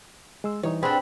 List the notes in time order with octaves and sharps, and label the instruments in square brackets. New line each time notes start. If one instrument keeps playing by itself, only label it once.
[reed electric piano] G#3 C6 E6
[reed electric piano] E3 G3 D#4 [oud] C#5
[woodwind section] G2 F#5 B5 [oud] C4 D4 [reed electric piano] G#4